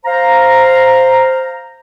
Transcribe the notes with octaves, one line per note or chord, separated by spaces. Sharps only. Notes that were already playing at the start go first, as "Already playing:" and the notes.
C5 F5 A#5